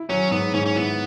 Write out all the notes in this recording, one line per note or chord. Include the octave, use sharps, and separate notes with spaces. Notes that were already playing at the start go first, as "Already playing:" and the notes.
Already playing: E4
F#3 C#4
G#2 B3
G#2 C#4
C#4
B3 E4